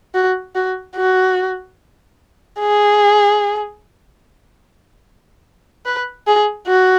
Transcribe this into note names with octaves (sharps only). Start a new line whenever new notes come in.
F#4
F#4
F#4
G#4
B4
G#4
F#4